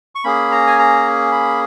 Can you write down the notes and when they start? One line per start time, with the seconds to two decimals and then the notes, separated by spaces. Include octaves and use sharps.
0.15 C#6
0.24 A#3 C#4 G#4 B5
0.51 A#5
0.67 G#5
0.79 A#5
1.32 B5